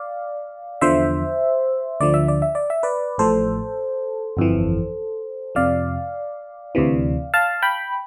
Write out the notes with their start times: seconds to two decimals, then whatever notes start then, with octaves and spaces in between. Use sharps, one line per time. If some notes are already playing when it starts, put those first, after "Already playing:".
Already playing: D5 F5
0.81 E2 D3 F3 C5 E5
2.00 D2 D3 F3 D5
2.14 E5
2.28 D5
2.42 E5
2.55 D5
2.70 E5
2.83 B4 D5
3.18 A1 A2 F3 A4 C5
4.37 G1 F2 E3
5.55 F2 C3 F3 D5 F5
6.75 D2 C3 E3
7.34 F5 A5
7.62 G5 B5